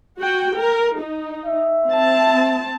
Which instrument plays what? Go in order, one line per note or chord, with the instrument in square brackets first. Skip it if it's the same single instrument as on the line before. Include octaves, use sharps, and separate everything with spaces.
[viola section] F#4 G5
A#4
D#4
[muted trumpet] E5
[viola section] C4 A5